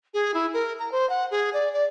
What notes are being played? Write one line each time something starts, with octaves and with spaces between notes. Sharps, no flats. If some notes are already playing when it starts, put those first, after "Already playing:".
G#4
E4
A#4
A#5
C5
F#5
G#4
D5
D5